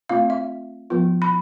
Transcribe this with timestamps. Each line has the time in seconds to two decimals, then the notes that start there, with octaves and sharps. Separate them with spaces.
0.09 A3 C4 F4 F5
0.30 E5
0.90 F3 B3 F4
1.22 B5